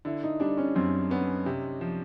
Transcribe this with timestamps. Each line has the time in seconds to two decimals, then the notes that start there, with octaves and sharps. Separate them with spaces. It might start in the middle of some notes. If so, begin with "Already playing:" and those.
0.05 D3 E4
0.23 D#4
0.40 G3 D4
0.57 C#4
0.75 F#2 C4
1.10 B3 C#4
1.46 C3
1.81 F3